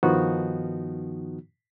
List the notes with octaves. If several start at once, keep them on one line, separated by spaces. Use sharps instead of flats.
G2 D#3 F3 B3 D#4 F#4